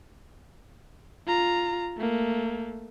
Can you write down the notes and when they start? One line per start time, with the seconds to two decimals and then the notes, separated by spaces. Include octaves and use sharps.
1.27 F4 A#5
1.98 A3 A#3